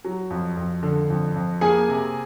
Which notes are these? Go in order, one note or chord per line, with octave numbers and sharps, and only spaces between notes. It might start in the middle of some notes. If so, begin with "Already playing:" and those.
F#3
F2
F2
D3
F2
F2
A#3 G#4 G#5
C3